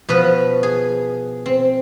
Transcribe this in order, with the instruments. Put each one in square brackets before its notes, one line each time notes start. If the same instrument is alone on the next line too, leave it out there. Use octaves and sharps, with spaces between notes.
[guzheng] B2 F3 B3 B4
G#4
C4